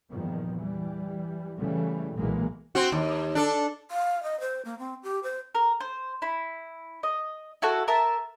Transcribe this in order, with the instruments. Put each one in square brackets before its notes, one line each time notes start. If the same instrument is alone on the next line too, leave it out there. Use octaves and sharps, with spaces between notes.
[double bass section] E2 G2 A#2 D#3 F3
E3 G3
C#3 E3 G3 A3
B1 A#2 E3 G#3 A#3
[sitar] C4 F#4
D#2
D4 A4
[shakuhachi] F5
D#5
C5
A#3
C4
G4
C5
[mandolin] A#4
C5
E4
D#5
E4 F#4 A4 F#5
A#4 E5 A5